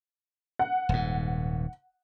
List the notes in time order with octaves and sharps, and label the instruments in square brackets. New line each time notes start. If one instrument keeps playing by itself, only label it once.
[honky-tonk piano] F#5
[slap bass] D#1 G#2